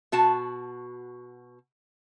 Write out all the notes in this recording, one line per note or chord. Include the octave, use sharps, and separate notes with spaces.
B2 F#4 A5